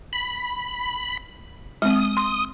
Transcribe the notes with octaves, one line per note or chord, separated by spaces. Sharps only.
B5
G#3 C4 D#6
C6